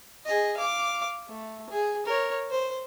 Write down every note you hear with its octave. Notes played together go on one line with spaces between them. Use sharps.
G#4 D#5
F5 D6
A3
G#4
A#4 C#5
C5